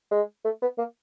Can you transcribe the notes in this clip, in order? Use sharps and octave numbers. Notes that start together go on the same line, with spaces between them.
G#3
A3
B3
A#3